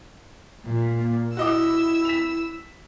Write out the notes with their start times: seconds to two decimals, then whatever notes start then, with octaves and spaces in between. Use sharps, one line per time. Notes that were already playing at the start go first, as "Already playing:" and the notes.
0.64 A#2
0.99 A#3
1.37 E4 F#4 D#5 D6 E6
2.05 B6 F7